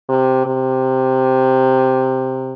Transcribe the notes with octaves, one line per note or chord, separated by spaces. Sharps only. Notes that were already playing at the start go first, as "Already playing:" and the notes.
C3
C3